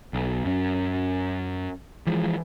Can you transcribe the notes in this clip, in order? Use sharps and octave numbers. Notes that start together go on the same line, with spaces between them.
B1
F#2 C#4
E3 F3 G#3